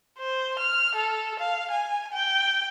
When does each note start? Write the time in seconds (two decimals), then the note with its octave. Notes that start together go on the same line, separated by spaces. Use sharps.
0.19 C5
0.59 F6
0.95 A4
1.40 F5
1.71 G#5
2.13 G5